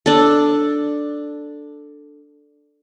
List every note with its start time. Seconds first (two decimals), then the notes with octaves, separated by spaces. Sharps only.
0.06 D4 A4